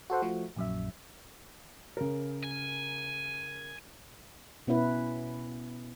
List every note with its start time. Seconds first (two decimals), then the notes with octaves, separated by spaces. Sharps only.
0.10 F#4 A4 C5 F#5
0.22 F3 A3 F#4
0.56 A#1 F#2 E5
1.97 C#3 A#4
2.43 G#5
4.67 B2 B3 C#4 E4 B4